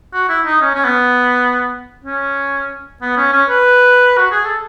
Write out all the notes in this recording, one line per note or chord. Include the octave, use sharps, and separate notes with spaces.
F#4
E4
D#4
C#4
C#4
B3
C#4
B3
C#4
C#4
B4
F#4
G#4
A4